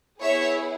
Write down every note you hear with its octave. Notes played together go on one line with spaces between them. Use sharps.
B3 E4 G#4 C#5 E5